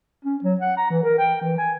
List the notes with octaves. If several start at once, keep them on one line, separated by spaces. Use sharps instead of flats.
C#4
F#3
F#5
A#5
E3
A#4
G5
E3
G#5